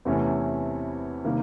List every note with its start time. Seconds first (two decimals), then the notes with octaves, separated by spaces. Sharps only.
0.05 E2 C3 E3 A3 C#4
1.25 C3 D#3 G3 A#3